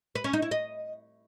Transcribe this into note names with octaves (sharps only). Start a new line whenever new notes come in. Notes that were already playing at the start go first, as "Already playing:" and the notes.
B4
C#4
D#4
E4
D#5